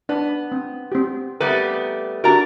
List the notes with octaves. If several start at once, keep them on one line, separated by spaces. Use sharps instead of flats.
B3 D4 D5
C4
C4 G4
G3 A3 B3 A#4
D4 F#4 G4 A#4 D5 A#5